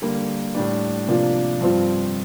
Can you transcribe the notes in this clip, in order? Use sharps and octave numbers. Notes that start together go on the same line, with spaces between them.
D3 G3 A#3
A2 G3 D4
C3 F3 A#3 D4 F4
G2 F3 C4 F4